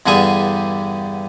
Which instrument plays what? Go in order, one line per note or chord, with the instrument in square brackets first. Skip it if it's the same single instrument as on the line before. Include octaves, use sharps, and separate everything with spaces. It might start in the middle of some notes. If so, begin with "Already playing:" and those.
[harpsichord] E2 G2 D3 G3 G#4 G#5